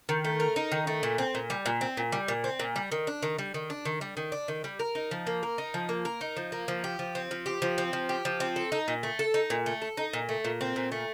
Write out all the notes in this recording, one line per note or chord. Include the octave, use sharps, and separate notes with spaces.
D#3
A3
A#4
D#4
D#3
A3
A#2
C4
A#2
G3
A#2
C4
A#2
G3
A#2
C4
A#2
G3
D#3
D4
D#3
G3
D#3
D4
D#3
G3
D#3
D4
D#3
G3
A#4
D#4
F3
A#3
A#4
D#4
F3
A#3
A#4
D#4
F3
A#3
F3
G4
F3
C4
F3
G4
F3
C4
F3
G4
F3
C4
A4
D#4
A#2
A3
A4
D#4
A#2
A3
A4
D#4
A#2
A3
A#2
C4
A#2
A3